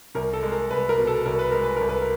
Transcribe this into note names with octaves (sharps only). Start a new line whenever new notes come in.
C2 A#4
A4
G#3
A#4
C2 B4
A#4
B2
A4
C2 A#4
B4
G#3 A#4
B4
C2 A#4
B4
A#4